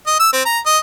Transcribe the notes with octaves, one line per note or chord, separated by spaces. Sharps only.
D#5
E6
C4
A#5
D#5